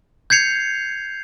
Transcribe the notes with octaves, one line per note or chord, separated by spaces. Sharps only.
G6 G#6 C7 C#7 F7